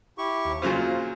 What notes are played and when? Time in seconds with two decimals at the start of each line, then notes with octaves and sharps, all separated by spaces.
0.18 E4 G4 C#6
0.45 D#2
0.62 F2 A#2 C#3 F#3 F4 C5